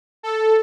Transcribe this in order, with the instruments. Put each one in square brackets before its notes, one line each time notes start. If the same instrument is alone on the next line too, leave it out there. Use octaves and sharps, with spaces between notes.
[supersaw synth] A4